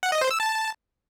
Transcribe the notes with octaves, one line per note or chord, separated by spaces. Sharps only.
F#5
D#5
C5
E6
A5